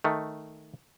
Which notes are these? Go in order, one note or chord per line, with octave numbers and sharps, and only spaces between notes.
D#3 A3